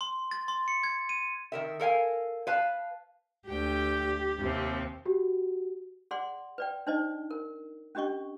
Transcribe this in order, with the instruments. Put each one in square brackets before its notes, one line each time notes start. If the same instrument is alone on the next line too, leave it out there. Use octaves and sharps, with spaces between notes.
[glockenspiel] C6
A6
C6
C#7
G#6
D#7
[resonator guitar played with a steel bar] D#3 A#4 E5
A4 A#4 F5 G#5
B4 F5 A5
[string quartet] D2 G5 [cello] G4
[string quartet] D#2 C3 C4
[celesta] F#4 G4
[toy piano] G#4 D5 F#5 C6
B4 D5 G5
D4 D#4 C5 D5 D#5
A#4
C#4 D4 G4 D#5 C#6